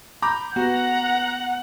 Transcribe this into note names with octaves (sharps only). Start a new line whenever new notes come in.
A#5 B5 D6 G6
B3 F#4 F#5 A#5